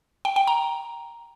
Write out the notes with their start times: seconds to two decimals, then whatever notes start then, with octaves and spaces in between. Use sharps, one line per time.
0.25 G5
0.36 G5
0.47 A#5